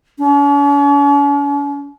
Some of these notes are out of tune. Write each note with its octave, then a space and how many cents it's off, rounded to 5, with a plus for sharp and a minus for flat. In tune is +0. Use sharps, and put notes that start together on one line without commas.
C#4 +45